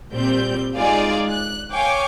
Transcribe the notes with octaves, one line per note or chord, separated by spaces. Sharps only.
A#2 G3 C4 G6
G#3 D#4 F4 G#4 D5 F5
F#6
C#5 F5 G5 G#5 C#6 D6